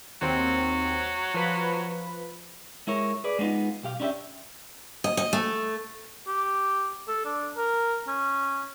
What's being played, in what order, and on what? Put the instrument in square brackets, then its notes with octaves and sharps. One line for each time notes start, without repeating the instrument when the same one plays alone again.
[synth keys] D#2 C4 [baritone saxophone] F#3
[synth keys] F3 B4 B5
[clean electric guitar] G#3 E4 A#4 C#5
G#4 B4 D5
G#3 B3 C4 D#4 F4
B1 G4 F5
C#4 D4 E4 G4 E5
[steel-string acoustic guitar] D#5
D#5
A3
[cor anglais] G4
A4
D4
A#4
C#4